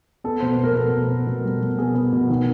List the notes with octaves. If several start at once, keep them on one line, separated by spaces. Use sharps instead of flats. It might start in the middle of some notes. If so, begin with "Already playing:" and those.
B3 A4
B2 C5
B4
B2
A#4
B2 A4
B2
B3
B2
G3
B2
B3 G#4
B3
B2
D#3